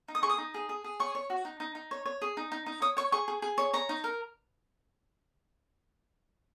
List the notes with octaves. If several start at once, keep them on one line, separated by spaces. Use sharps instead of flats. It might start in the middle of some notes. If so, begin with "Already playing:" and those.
D#4
D#6
G#4 C#6
D#6
D#4
G#4
G#4
G#4
C#5 C#6
C#5
F#4
D#4
D#4
D#4
C#5
C#5
G#4
D#4
D#4
D#4
C#5 D#6
C#5 C#6
G#4 C#6
G#4
G#4
C#5
C#5 A#5
D#4
A#4